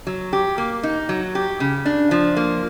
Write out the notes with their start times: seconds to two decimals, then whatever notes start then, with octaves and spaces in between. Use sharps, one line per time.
0.07 F#3
0.33 G4
0.58 A#3
0.83 D#4
1.09 F#3
1.35 G4
1.60 C#3
1.86 D4
2.11 F3
2.36 A#3